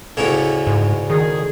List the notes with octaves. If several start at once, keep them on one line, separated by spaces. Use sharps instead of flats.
D2 A2 C#3
G#2
D#3 G#4